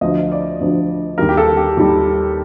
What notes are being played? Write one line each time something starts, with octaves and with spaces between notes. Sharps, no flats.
D2 D3 F3 D#5
D5
D2 D3 F3
D#2 D#3 G3 A#4
G4
A4
G4
D#2 D#3 G3